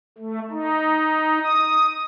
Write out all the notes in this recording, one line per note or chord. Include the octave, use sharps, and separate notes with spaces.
A3
D#4
D#6